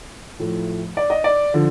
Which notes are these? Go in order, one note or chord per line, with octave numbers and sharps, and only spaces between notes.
A2 F3 A3
D5
D#5
D5
D3 F3